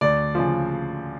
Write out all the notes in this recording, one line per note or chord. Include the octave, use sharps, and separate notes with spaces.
D2 D5
C#3 F3